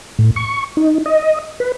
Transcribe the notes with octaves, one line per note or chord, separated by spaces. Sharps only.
A2
C#6
D#4
D#5
B4